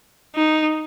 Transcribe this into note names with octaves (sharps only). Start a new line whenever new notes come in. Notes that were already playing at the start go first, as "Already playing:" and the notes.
D#4